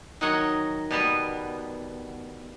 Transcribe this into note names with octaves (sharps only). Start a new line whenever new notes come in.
D#3 F#3 F#4 C#5 D#5 F#5
B2 G3 B3